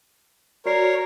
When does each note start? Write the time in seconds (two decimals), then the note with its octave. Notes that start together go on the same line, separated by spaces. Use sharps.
0.66 F#4 A#4 C#5 D5 C7